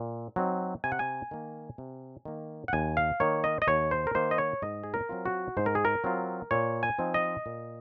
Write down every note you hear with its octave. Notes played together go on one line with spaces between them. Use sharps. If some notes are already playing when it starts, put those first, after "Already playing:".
Already playing: A#2
F#3 C4 D#4
C3 G#5
F#5
G#5
D#3 A#3
C3
D#3 A#3
F#5
D#2 G#5
F5
D#3 A#3 C#5
D#5
D#5
D#2 C#5
C5
A#4
D#3 A#3 C5
D#5
C#5
G#2 D#5
G#4
A#4
F#3 C4 F4
F#4
G#2 C5
A#4
G#4
A#4
F#3 C4 F4
A#2 C#5
G#5
F3 C4 D#4
D#5
A#2